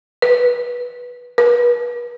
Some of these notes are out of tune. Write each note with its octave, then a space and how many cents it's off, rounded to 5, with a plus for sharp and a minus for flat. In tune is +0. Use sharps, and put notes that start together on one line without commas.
B4 -10
B4 -40